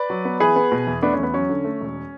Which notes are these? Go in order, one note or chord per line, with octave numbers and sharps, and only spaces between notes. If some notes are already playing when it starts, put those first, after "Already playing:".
Already playing: B4 D5
F#3
B3
E3 G#4 B4
B3
B2
E2
A3 B3 D4
C#4
E2 B3
F#3 C#4
D3
A3
E1